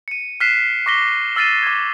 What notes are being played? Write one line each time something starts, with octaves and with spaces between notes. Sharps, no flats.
C#7 D#7
F6 F#6 B6 C7 D#7 E7
C#6 D6 A#6 B6 G7
E6 F6 A6 C7 D#7 E7
D6 G#6